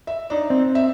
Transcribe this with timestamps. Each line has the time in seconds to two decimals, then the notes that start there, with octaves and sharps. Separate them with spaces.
0.07 E5
0.30 D4 D#4
0.50 C4
0.75 E5